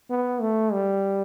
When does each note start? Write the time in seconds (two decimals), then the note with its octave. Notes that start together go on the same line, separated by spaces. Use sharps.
0.10 B3
0.41 A3
0.73 G3